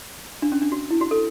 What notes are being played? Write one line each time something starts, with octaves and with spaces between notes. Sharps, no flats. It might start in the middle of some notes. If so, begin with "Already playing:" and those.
D4
C#4
D4
F#4
E4
F#4
A4